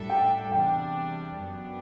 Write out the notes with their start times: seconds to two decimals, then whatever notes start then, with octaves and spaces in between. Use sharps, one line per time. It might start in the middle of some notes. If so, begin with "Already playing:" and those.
Already playing: A2 G3 D4 A4 E5
0.10 G5
0.52 E2 C3 G3 D4 G5
1.38 F#2 F#3 B3 D4